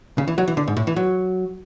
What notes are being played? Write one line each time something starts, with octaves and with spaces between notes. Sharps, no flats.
C#3
E3
F#3
E3
D3
G#2
A2
E3
F#3